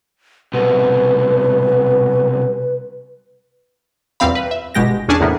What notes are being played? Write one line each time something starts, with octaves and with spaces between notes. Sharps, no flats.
C2 B2 B4
E2 A#2 G3 C4 F5 B5
B4
E5
G1 B2 G#3 G4 A#6
E2 C#4 D4 G#4 G#5 A5
E2 A2 C3 A#3 B3